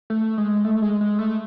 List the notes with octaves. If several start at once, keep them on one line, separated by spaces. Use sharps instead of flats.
A3
G#3
A3
G#3
G#3
A3